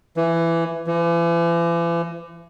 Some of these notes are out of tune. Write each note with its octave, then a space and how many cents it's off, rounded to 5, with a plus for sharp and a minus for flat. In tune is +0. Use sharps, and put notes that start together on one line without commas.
E3 +15
E3 +40